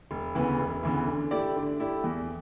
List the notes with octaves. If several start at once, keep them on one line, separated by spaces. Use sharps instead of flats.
E1
D2 C#3 E3 B3
E1
D2 C#3 E3 B3
D3
A3 E4 G4 D5
D3
A3 E4 G4 D5
E2